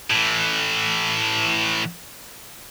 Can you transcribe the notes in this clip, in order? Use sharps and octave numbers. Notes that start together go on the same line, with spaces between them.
A2 E3